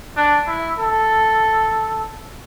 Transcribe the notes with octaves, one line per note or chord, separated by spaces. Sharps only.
D4
E4
A4